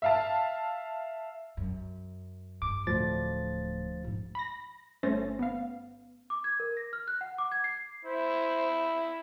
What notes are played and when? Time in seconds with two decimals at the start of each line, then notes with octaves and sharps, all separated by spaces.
0.02 E5 F5 A5
1.57 F#2
2.62 G2 D6
2.87 D1 D2 F3 A6
4.04 G#2 B3
4.35 B5 A#6
5.03 G1 A3 C#4 C5 A6 A#6
5.39 B3 F5
6.30 D6
6.44 G#6
6.60 A#4
6.77 A#6
6.93 F6
7.08 F#6
7.21 F#5
7.38 D6
7.52 G#6
7.64 C7
8.05 E4 C5